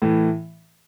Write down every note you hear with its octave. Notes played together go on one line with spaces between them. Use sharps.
A2 E3